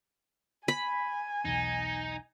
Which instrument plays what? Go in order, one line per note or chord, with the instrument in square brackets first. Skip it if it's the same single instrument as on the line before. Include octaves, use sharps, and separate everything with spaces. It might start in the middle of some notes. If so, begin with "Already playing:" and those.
[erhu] G#5 [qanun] B5
[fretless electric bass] B1 E2 [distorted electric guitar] D#4